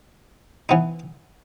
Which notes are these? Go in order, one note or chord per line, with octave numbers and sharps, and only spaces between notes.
E3 B3 D#4